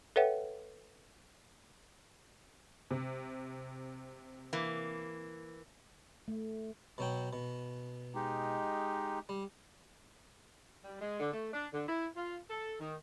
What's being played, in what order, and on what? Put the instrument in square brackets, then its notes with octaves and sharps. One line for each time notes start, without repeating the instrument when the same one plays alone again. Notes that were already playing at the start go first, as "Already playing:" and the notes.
[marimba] A4 B4 C#5 E5 F#5 G5
[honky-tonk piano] C3
[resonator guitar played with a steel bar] E3 A#3
[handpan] A3
[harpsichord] B2 F#3 G5
B2
[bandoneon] G#3 D#4 G4
[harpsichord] G3
[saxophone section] G3
G#3
D3
A3
D4
D3
E4
F4
A4
D#3